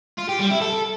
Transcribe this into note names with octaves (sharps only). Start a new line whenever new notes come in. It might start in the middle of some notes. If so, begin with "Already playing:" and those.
F4
G4
G3
E4
A4